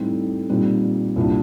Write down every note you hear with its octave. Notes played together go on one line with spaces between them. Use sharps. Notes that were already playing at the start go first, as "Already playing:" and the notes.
Already playing: A2 G3 C4 D#4
A#2 G3 C4 D#4
C2 A#2 G3 D4